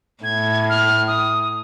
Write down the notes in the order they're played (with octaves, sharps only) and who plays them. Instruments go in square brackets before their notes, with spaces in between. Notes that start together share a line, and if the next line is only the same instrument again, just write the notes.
[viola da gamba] A2 [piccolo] G#6
[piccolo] F6
D#6